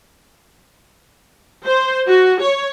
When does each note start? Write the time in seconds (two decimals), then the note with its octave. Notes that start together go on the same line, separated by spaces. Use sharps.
1.65 C5
2.07 F#4
2.40 C#5